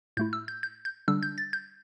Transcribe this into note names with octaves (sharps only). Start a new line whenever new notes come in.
A2 A3 E4 G6
E6
G6
G6
G6
D3 G3 D4 E6
G6
A6
G6